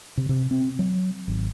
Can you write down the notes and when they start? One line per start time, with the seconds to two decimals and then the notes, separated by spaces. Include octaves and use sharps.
0.17 C3
0.29 C3
0.51 C4
0.79 F#3
1.28 G#1